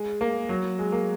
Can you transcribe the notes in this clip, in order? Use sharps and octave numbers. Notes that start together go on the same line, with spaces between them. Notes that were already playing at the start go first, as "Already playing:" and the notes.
Already playing: G#3
A#3
F#3
G#3
A#3